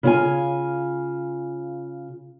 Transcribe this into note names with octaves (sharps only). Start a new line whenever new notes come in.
C#3 F4 G#5